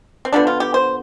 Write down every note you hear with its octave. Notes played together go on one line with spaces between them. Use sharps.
C4
D3 F3 B3 D4
F4
G4
C5